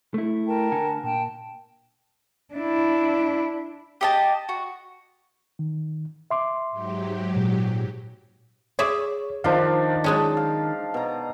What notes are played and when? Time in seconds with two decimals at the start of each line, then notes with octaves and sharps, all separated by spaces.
0.14 A3 E4
0.47 A#4 G5 A5
0.72 D3 F#5 G#5
1.03 A#2 G5 A5
2.54 D4 E4
4.01 G4 D#5 A5
4.49 F#4
5.59 D#3
6.31 E5 C6 D6
6.71 G#2 F#3 G4
7.36 A#2
8.79 G#4 C#5 D5 E5
9.44 D#3 F3 D4 D#4 F4 C5 F5
10.04 F#3 G#3 C#4 A5
10.37 F5
10.94 B2 A#5